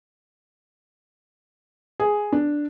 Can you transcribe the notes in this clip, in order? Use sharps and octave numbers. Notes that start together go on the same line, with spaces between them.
G#4
D4